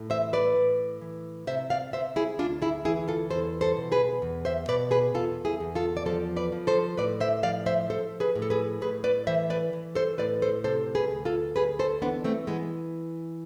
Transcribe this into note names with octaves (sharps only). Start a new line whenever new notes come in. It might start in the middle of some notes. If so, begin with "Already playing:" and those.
Already playing: A2
E3 C5 E5
B4 D5
A2
E3
C3 C5 E5
D5 F5
C3 C5 E5
E4 G#4
D2 D4 F4
E4 G#4
E3 E4 G#4
F4 A4
E2 A4 C5
A4 C5
B2
G#4 B4
E2
C5 E5
B2 B4 D5
G#4 B4
E2 F4 A4
E4 G#4
E2
F4 A4
D5
F3 A4 C5
B4 D5
F3
A4 C5
A2 B4 D5
C5 E5
F3 D5 F5
C5 E5
F3 A4 C5
G#4 B4
A2
A4
G#4 B4
A2 G#4 B4
B4 D5
E3 C5 E5
B4 D5
E3
A4 C5
A2 B4 D5
A4 C5
C3 A4 C5
G#4 B4
D2
F4 A4
D2 G#4 B4
A4 C5
E3 B3 D4
A3 C4
E3 G#3 B3